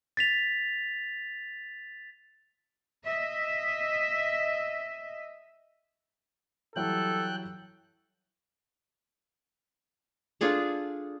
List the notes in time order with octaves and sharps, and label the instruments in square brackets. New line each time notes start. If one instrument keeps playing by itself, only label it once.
[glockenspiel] A6 B6 F7
[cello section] D#5 E5
[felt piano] E3 F#3 G3 [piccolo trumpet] A4 [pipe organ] G5 F#6
[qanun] D4 F4 G#4 A4